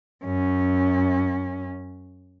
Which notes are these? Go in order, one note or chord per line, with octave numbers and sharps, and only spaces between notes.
F#2 C#4